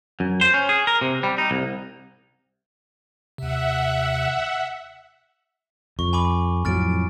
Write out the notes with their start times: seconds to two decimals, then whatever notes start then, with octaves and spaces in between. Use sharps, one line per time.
0.20 F#2
0.41 C5
0.54 C#4
0.69 G#4
0.87 A#4
1.01 C3
1.23 G3
1.38 D#4
1.51 C2
3.38 D#2 C3 E5 F#5
5.99 F2 C#6
6.13 G#5 B5 D6
6.65 F2 A2 F#3 F6 A6 D7